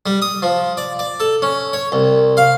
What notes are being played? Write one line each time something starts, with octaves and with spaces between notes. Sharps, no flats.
G3
D#6
F3
D5
D5
A4
C#4
C#5
C2
F5